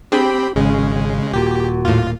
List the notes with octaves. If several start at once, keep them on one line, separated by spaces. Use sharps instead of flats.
C4 D4 G4 G#4 G5 B5
G#1 C#3 G#3 C#4
D#1 A#2 F#4 G4
D#2 A2 F4